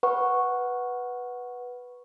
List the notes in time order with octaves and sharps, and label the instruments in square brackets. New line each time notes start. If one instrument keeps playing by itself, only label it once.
[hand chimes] B4 F#5 C#6